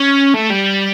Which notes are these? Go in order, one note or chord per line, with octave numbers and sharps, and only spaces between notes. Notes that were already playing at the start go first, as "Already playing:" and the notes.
Already playing: C#4
A3
G3